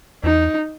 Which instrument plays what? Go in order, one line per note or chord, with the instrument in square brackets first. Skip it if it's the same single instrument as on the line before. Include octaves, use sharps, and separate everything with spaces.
[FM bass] E2 [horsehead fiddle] D#4